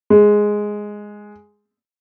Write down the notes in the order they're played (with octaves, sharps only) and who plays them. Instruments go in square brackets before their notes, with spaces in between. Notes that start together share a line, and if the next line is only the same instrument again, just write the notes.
[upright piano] G#3